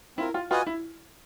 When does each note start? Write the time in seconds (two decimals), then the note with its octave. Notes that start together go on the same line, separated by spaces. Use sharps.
0.17 C4 E4 F4 A#4
0.34 F4
0.51 F4 F#4 B4 D#5 G#5
0.66 E4